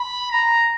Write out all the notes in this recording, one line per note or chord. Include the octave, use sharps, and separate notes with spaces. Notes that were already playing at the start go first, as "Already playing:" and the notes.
Already playing: B5
A#5